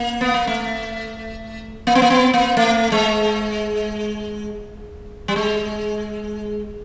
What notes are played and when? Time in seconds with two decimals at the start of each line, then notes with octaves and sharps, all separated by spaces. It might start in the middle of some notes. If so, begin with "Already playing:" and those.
Already playing: A#3
0.21 B3
0.34 A#3
0.47 A3
1.87 A#3
1.95 B3
2.02 A#3
2.10 B3
2.33 A#3
2.57 A3
2.92 G#3
5.28 G3
5.36 G#3